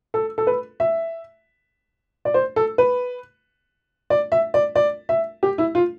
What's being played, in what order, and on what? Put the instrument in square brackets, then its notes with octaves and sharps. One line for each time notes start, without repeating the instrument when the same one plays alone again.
[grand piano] A4
A4
B4
E5
D5
C5
A4
B4
D5
E5
D5
D5
E5
G4
E4
F4